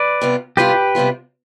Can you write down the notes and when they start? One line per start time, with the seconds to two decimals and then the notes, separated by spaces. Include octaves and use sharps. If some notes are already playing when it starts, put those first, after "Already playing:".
Already playing: B4 D5
0.21 C3 G3 B3 F4
0.57 C3 G3 B3 F4 G4 B4
0.95 C3 G3 B3 F4